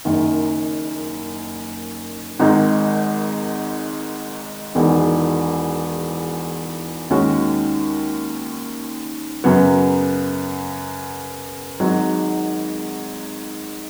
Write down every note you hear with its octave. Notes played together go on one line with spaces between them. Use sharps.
F#1 F#2 D#3
G#1 G#2 D#3 G#3 D#4
E1 E2 D#3
D#2 D#3 G#3 C#4 F#4
F#2 C#3 F#3 B3
G#1 G#2 F#3